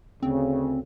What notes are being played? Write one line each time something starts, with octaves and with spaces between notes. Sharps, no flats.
D2 C#3 C4